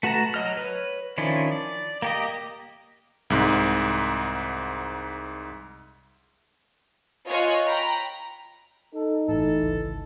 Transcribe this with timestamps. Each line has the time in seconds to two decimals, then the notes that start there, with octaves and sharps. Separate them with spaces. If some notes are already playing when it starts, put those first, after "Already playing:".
0.03 A3 F#4 B4 A5 A#5
0.34 F#3 D#5 F6
0.57 B4 C#5
1.18 D#3 F3 C#4 D4 E4
1.52 D5
2.02 A#3 G4 D#5
3.30 C2 G#2
7.28 F4 C#5 D#5 G#5 C#6 F#6
7.66 G5 A#5 B5
8.94 D#4 A4
9.28 G1 A2 E3 A4
9.61 G#1 C#2